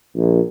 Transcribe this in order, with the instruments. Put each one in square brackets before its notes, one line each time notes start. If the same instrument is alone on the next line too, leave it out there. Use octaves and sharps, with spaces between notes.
[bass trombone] A#1